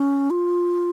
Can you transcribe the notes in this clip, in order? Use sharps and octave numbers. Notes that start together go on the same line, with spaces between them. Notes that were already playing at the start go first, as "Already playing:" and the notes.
Already playing: C#4
F4